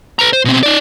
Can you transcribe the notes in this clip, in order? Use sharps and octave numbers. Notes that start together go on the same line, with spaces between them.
B4 A#5
C5
B2 C4
D#4 D5